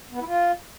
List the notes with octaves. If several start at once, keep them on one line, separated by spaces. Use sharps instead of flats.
B3
E4
F4